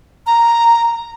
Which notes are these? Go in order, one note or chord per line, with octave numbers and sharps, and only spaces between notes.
A#5